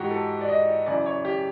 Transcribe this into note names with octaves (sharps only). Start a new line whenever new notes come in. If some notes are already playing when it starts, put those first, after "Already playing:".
Already playing: G#2 E3 F#4 G4
A4
D5
D#5
F#2 C#3 E3 D5
C#5
G4